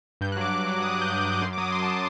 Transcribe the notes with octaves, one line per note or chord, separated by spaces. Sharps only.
G2 G6
F#6
F#3 D6
G2 D6
F#3
G2 D#6
F#6
F#3 G6
G2 G6
F#6
F#3
D6
F#2 C6
D6
F#3 D#6
D6
F#2 C6
A5
F#3 C6